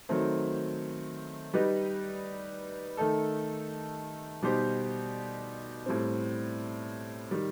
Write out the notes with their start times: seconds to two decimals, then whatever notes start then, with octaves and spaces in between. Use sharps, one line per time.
0.09 D#3 F#3 A3 C4
1.54 G3 D#4 G4 B4 D#5
2.97 D#3 A3 D#4 A4
4.42 B2 G3 D#4 G4 C5
5.86 A2 G3 C4
7.31 D#3 G3